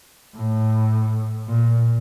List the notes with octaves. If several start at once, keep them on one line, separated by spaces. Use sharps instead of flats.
A2
A#2